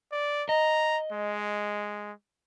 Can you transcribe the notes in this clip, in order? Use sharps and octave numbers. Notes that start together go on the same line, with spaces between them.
D5
D#5 A#5
G#3